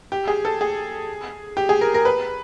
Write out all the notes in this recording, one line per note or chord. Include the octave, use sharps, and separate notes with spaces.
G4
G#4
A4
G#4
G4
G#4
A#4
A#4
B4